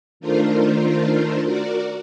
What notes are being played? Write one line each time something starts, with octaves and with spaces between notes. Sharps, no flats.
D#3 A3 D4 F4 A#4 C5
F#4 A#4 D5